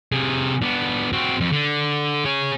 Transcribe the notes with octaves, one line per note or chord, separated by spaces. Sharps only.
C3 G#4
B3 D4
C4 F#4
F2
D3
G#4 C#5